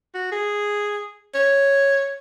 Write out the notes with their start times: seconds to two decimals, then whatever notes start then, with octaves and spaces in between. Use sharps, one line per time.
0.14 F#4
0.32 G#4
1.35 C#5